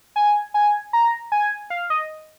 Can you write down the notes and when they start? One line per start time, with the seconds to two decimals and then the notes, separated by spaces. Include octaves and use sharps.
0.16 G#5
0.54 G#5
0.93 A#5
1.32 G#5
1.70 F5
1.90 D#5